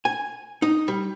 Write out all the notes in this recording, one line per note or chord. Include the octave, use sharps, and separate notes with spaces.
G#5
D#4
G3